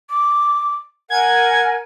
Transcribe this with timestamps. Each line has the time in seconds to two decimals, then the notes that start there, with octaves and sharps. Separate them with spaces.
0.10 D6
1.10 A#4 F#5 G#5 G#6